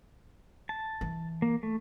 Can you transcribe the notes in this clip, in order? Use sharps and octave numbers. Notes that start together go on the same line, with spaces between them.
A5
E3
A#3
A3